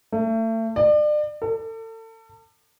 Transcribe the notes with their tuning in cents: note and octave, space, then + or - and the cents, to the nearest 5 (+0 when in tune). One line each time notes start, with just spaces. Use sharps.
A3 +35
D5 +35
A4 +35